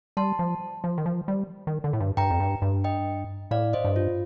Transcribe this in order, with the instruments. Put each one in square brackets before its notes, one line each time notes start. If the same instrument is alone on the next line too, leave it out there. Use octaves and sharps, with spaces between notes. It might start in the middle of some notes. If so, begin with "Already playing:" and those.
[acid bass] G3 [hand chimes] A5 C6
[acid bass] F3
F3
D#3
F3
G3
D#3
D3
A2
G2
[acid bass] G2 [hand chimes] G5 A#5
[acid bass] F2
G2
G2
[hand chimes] D#5 G5
[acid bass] A2 [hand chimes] D5 F5
[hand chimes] C5 D#5
[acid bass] G2
[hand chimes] F4